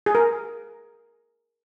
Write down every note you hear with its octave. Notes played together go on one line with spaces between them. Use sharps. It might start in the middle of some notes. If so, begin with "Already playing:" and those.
G#4
A#4